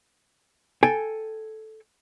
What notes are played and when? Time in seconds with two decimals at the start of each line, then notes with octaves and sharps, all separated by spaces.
0.83 A4 G5 G#5